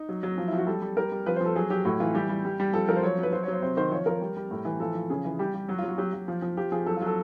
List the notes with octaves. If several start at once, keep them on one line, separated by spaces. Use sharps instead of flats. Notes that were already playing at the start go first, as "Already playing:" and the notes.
Already playing: D#4
F#3
F#3
F3
E4
F3 F#4
G3 A4
G3
G3 A#4
G3
F3 B4
C5
F3 A4
F#3 G#4
F#3 G4
A2 F#4
E3 F4
G3 G4
G3
G3
G3
F3 A4
F3 A#4
C5
F#3 C#5
F#3 B4
F#3 C5
C#5
F#3 C5
C3 C5
D#3 C5
F3 C#5
F3 A#4
G3
G3
A2
E3
F3 A4
F3
C#3 G#4
E3
G3 G4
G3
F#3 F#4
F4
F#3
F#4
F#3 G4
F#3
F3
F3
F3 G4
F3 G#4
F#3 A4
F4
F#3 A4